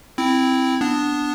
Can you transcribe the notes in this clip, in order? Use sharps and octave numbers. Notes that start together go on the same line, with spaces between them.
C4 E4
B3 D4